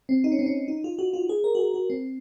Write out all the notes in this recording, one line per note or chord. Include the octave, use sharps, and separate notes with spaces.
C4
D#4
C#4
C4
C#4
D#4
F4
F#4
F4
G#4
A#4
F#4
G#4
F#4
C4